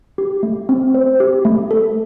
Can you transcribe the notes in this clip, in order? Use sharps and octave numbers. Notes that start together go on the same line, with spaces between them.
G4
A3
C4
C5
G4
A3
A4